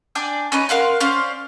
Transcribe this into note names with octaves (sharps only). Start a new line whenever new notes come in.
D4 D5 G5 G#5
C#4 D#4 B4
A#4 F5 F#5 C6
C#4 C5 D5 F5